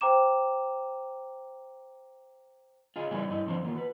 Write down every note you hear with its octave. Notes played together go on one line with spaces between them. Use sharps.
C5 G5 A#5 D6 E7
F4 G#4 D#5
C#3 G3 B3 D#4 E4 D5
G2 E4 D#5
D3 F3 C4 D4 C5
D#3 A#3 F4
F#4 B4